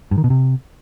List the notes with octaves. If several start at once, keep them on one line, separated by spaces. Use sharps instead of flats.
G2
D#3
B2
C3